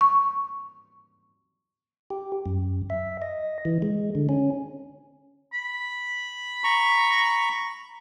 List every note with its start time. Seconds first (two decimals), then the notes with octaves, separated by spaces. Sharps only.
0.01 C#6
2.10 G4
2.46 F#2
2.90 E5
3.22 D#5
3.65 E3
3.82 G#3
4.15 D3
4.29 C#4
5.53 B5
6.64 A#5 C#6